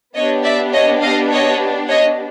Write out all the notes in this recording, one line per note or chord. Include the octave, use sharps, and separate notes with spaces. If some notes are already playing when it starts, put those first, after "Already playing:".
B3 D4 G4 C#5 D#5
D5 E5
C#5 D#5
D#5 F5
C#5 D#5
C#5 D#5